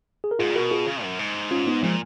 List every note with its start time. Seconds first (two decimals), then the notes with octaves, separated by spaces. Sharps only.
0.24 G#4
0.31 A#4
0.39 G#2 F4 G#4
0.50 A#2
0.55 B2 F#4 A#4
0.71 F4 G#4
0.87 C#3
1.03 F#2
1.19 G#2
1.51 C#4 F4
1.67 B3 D#4
1.83 A#2 F3 G#3